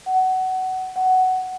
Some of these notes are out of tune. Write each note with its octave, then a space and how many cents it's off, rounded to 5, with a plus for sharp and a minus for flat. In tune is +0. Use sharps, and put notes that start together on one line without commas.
F#5 +20
F#5 +10